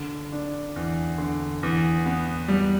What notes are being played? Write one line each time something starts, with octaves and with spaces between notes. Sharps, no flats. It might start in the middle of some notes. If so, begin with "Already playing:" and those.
Already playing: D3
D4
E2
D3
E2
B3
G3